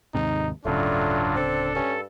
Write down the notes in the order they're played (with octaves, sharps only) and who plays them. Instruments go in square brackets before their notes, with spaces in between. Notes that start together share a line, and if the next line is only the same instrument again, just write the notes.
[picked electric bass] D#2 G#2 C3 [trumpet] D#4
[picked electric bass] D1 C#3 [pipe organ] G2 F#3 F4 [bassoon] A3 [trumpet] D4
[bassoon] C4 [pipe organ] A4
[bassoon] G2 [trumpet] C#4